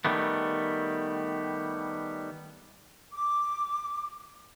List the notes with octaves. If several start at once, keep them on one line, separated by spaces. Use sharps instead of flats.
D#3 G3 A3 B3
D6